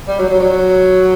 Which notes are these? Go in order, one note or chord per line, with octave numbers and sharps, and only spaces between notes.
G3
F#3
F#3
F#3